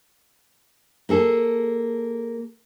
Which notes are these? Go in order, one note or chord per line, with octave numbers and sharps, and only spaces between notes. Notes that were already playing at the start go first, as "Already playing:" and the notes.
A#3 G#4 A4